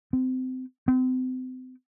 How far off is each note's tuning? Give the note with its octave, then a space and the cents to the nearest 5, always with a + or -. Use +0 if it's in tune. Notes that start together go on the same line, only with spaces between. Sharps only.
C4 -30
C4 -35